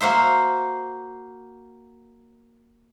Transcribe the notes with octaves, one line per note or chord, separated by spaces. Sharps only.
A#3 F#4 C5 E5